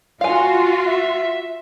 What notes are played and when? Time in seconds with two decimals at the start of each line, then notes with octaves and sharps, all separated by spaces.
0.21 F4 F#4 F5 G#5
0.86 E5